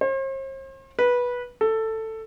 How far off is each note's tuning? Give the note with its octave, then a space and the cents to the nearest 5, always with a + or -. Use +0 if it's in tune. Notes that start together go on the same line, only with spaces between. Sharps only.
C5 +45
B4 -15
A4 +10